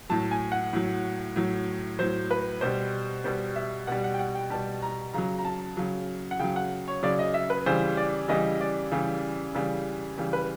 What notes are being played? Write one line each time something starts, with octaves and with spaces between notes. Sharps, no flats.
A2 F#3 A5
G#5
F#5
A2 F#3
A2 F#3
A2 F#3 C5
B4
B2 G3 C5
B2 G3 C5
E5
B2 G3 F#5
F#5
G5
F#5
G5
B2 G3 A5
A#5
C#3 F#3 A#5
A#5
A5
C#3 F#3
F#5
C#3 F#3 G5
F#5
C#5
C#3 F#3 D5
D#5
E5
B4
C#3 E3 G3 C5
D5
C#3 E3 G3 D#5
D5
C#3 E3 G3
C#3 E3 G3
C#3 E3 G3
B4